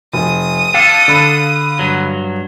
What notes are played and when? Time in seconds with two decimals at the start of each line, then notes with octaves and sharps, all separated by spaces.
0.14 F1 D#6
0.74 D4 A4 F5
1.08 D3 B5
1.79 G2 F#3